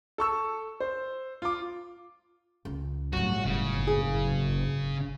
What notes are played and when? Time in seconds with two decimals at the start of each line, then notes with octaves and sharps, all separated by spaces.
0.18 A4 C#6 E6
0.80 C5
1.42 F4 D6
2.65 C#2
3.13 G1 A2 F#3 F#4
3.45 F#1 C#3
3.87 G#4